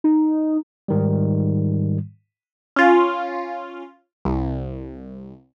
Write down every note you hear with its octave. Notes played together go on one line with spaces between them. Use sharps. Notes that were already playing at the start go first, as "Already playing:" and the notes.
D#4
G#2 D#3 G3
C#4 F4
C2